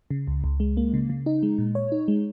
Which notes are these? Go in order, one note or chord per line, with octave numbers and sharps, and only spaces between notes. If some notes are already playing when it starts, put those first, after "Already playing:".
C#3
C#2
C#2
G#3
A#3
C#3
C#3
D#4
G#3
A#2
C#5
D#4
G#3